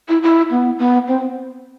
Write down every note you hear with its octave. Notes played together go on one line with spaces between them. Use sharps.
E4
E4
B3
B3
C4